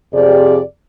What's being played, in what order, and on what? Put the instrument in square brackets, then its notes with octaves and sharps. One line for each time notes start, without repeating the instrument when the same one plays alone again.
[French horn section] F2 C3 G4 G#4 D5